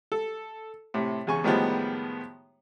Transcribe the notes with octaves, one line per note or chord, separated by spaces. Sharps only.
A4
A2 C3
E2 C#3 G#5 C#6
A2 D#3 F3 G3 G#3 B3